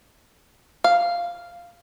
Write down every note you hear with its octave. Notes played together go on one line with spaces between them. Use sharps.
F5